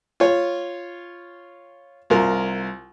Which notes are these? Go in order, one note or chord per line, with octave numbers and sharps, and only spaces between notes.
F4 C#5
C2 F4 A#4